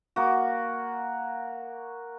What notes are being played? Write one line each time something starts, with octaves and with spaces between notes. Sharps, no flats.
A#3 F#4